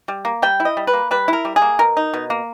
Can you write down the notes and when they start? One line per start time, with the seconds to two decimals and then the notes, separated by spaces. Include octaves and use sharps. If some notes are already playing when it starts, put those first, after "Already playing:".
0.08 G3
0.25 A#3
0.42 G3 G5
0.60 E4
0.65 D#5
0.77 G3
0.87 B4
0.94 A#3
1.11 G3 B4
1.28 E4 A#4
1.45 G3
1.56 G#4
1.62 A#3
1.79 B2 A#4
1.97 D#4
2.14 B2
2.30 A#3